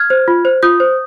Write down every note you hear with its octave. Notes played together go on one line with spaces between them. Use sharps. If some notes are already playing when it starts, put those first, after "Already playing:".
Already playing: F6 G#6
C5
F4
C5
F4 D#6 G6
C5